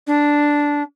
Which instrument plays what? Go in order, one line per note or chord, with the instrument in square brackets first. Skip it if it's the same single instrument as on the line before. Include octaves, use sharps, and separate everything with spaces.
[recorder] D4